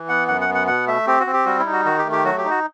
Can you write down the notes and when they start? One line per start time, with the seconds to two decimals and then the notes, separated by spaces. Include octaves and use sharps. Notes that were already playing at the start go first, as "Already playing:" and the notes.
Already playing: E3
0.09 B3 F#5
0.28 F#2 F#5
0.41 F#5
0.49 B3
0.54 F#5
0.67 B2 F#5
0.87 A3 E5
1.07 C4 G4
1.20 F#4
1.27 C4
1.33 G4
1.46 G3 F#4
1.59 E4
1.66 D#4
1.72 F#4
1.85 D#3 F#4
1.98 G4
2.05 A3
2.12 G4
2.24 F#3 F#4
2.38 G4
2.45 D#4
2.50 F#4